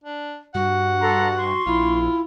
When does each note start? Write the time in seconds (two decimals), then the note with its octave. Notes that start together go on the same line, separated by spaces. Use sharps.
0.04 D4
0.55 G2 F#4 F#5
1.01 A4 A#5 C6
1.36 C6 C#6
1.66 A#1 E4 F4